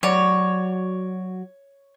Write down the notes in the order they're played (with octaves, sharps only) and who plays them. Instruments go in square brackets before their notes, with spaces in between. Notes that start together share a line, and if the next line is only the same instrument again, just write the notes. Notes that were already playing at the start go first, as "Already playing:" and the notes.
[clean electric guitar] F#3 F#4 D5 [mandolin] C#5